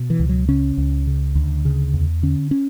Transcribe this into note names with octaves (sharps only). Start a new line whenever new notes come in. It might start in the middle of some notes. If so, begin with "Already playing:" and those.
Already playing: B2
E3
C#2
F#3
C#3 C#4
C#2
C#3
D2
C#3
E2
D3 C#4
C#4